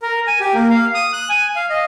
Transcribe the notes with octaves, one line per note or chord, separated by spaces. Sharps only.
A#4
G#5
G4
A#3
F5
D#6
F#6
G#5
F5
D#5